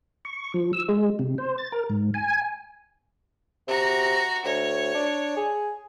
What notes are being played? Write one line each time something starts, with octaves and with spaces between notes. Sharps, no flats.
C#6
F3
E6
G#3
C3
C5
A6
A#4
G#2
G#5
C3 F#4 A#5
D2 C#5
D4
G#4